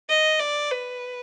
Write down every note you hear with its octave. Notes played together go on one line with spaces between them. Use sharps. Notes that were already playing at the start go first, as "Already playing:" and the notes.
D#5
D5
B4